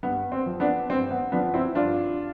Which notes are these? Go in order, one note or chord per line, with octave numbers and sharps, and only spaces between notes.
G2 B3
C4
F3
B3 D4
G2 C4
B3
F3 B3 D4
C4 E4
G2 D4 F4